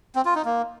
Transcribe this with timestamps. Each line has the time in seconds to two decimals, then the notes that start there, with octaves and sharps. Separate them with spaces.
0.15 C4
0.25 F4
0.35 D#4
0.45 A#3